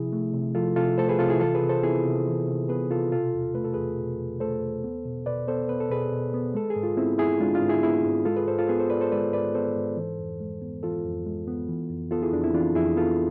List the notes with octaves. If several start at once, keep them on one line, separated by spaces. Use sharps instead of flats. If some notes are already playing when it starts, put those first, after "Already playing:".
Already playing: C3 F3 E4 G#4
A3
C3
F3 F4 A4
C3 F4 A4
A3 A4 C5
G#4 B4
C3 F4 A4
E4 G#4
E3 F4 A4
G#4 B4
C3
A4 C5
B3 E4 G#4
C3
E3
C3
B3 G#4 B4
C3 F4 A4
B2 F4 A4
E2
A3 B4
A4
E2 G#4 B4
B2
E2
A3 A4 C5
E2
B3
B2
B2 B4 D5
B3 A4 C5
B3 B4
A4
B2 G#4 B4
B2
B3
G#3 A4
G#4
G#2
F4
B3 C4 E4
G#2 E4 G#4
G#3 D4 F4
D4 F4
G#2
E4 G#4
B3 E4 G#4
G#2
G#3 F4 A4
G#4 B4
G#2 A4 C5
F4 A4
B3 G#4 B4
A4 C5
G#2 B4 D5
A4 C5
G#3 B4 D5
G#2 B4 D5
B3 A4 C5
G#2
E3
F2
G#3
B3
E3 F4 A4
F2
G#3
B3
E3
F2
B3 F4 A4
E4 G#4
F2 D4
C4 E4
E3 D4 F4
F2 E4 G#4
B3 F4 A4